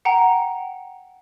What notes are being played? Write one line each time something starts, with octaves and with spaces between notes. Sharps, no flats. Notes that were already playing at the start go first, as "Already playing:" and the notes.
F#5 G5 A#5